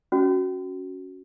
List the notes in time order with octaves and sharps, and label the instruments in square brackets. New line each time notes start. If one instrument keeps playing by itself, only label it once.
[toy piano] C#4 F#4